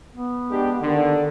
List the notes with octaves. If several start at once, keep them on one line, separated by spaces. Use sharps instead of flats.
B3
G#3 D4 G4
D3 D#3